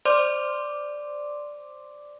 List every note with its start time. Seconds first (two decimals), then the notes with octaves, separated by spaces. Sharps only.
0.05 C5 D5 C6 D6